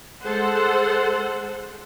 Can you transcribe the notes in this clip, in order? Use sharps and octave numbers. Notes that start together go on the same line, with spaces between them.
G#3 A4 C5 F#5